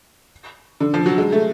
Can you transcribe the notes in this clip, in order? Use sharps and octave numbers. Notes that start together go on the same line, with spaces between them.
D3
F3
F#3
G#3
A3